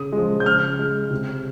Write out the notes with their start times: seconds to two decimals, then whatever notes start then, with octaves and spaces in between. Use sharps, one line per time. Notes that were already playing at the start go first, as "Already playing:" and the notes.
Already playing: C#3 D#6
0.12 G#3
0.17 F3
0.40 G6
0.45 C#3 F6
0.79 G#3
1.10 C3